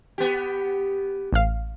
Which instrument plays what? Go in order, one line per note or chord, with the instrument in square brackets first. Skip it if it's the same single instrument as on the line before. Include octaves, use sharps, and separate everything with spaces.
[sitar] B3 G4
[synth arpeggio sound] A1 F5